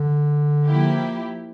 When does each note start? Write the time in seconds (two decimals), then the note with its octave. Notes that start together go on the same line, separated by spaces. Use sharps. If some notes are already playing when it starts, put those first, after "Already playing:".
Already playing: D3
0.66 F3 A#3 E4 G4